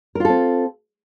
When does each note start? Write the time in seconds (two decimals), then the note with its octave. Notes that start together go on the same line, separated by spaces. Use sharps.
0.15 A#4
0.20 F4
0.25 A4
0.29 C4